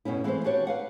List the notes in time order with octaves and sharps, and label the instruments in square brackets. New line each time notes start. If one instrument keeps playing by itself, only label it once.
[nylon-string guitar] G2 B2 A3 C#4 E4
E3 G#3 A3 C4 C5
D4 F#4 G4 C#5
B4 F5 F#5